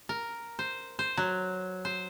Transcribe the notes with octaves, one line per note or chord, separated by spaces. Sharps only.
A#4
C5
C5
F#3
C5